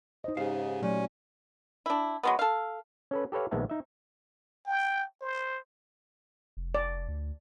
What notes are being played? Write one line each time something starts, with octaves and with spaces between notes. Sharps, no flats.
D#4 C5 D#5
G#2 C#3 G4 C5 F5
A#2 F#3 A3 C#4
D4 E4
F#3 G#3 B3
A4 F5
C#4 A4 B4
G4 A4 B4 C#5 F5
A#1 D#3 G#3 B3 E5 A5
D#4 E5
G5
C5
F1
D5
D2